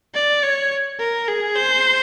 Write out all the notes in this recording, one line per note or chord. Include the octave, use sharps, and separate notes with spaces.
D5
C#5
A#4
G#4
C5